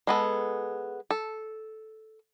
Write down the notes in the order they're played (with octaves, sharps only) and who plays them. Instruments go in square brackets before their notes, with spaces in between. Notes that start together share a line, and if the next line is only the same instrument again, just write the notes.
[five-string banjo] G#3 B3 A4
A4